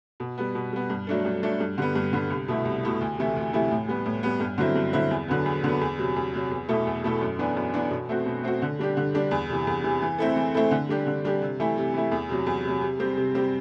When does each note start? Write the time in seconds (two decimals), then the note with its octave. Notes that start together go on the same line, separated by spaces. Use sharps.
0.20 B2
0.38 G3 B3
0.55 B2
0.73 G3 B3
0.90 G2
1.07 F#3 A3 D4 A4
1.25 G2
1.43 F#3 A3 D4 A4
1.60 G2
1.78 D3 G3 B3
1.95 G2
2.13 D3 G3 B3
2.30 C2
2.48 B2 A3 E4
2.65 C2
2.83 B2 A3 E4
3.01 D2
3.18 C3 E3 A3 E4
3.36 D2
3.53 C3 E3 A3 E4
3.71 A2
3.88 G3 B3
4.05 A2
4.23 G3 B3
4.40 G2
4.58 D3 F#3 C4 E4
4.76 G2
4.93 D3 F#3 C4 E4
5.11 E2
5.28 D3 F#3 B3
5.46 E2
5.64 D3 F#3 B3
5.81 E2
5.98 C3 F#3
6.16 E2
6.34 C3 F#3
6.51 E2
6.69 B2 A3 E4 A4
6.86 E2
7.04 B2 A3 E4 A4
7.21 F#2
7.39 E3 B3 D4
7.57 F#2
7.74 E3 B3 D4
7.91 B2
8.09 A3 C4 F#4
8.26 B2
8.43 A3 C4 F#4
8.62 D3
8.79 G3 D4 G4
8.97 D3
9.14 G3 D4 G4
9.31 E2
9.49 C3 E3
9.67 E2
9.84 C3 E3
10.02 E3
10.18 A3 C4 E4 A4
10.36 E3
10.54 A3 C4 E4 A4
10.71 D3
10.89 G3 D4 G4
11.07 D3
11.25 G3 D4 G4
11.42 C3
11.60 E3 A3 E4
11.77 C3
11.94 E3 A3 E4
12.12 E2
12.29 C3 F#3
12.46 E2
12.65 C3 F#3
12.81 C3
12.99 G3 C4 G4
13.17 C3
13.35 G3 C4 G4